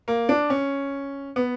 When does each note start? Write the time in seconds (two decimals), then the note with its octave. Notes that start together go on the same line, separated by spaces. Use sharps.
0.08 A#3
0.29 D4
0.50 C#4
1.36 B3